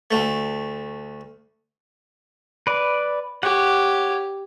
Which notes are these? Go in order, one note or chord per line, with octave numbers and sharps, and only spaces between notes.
D2 A3
B4 D5
G4 C#5 F#5